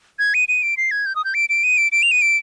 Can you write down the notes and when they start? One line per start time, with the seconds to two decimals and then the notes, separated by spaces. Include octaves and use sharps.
0.19 G#6
0.34 D#7
0.49 D#7
0.63 D7
0.77 C7
0.91 G#6
1.06 G6
1.16 D#6
1.25 G6
1.34 D7
1.49 D7
1.64 D#7
1.78 D7
1.92 D7
2.03 F7
2.11 D#7
2.22 D7